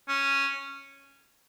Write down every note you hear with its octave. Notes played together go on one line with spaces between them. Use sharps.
C#4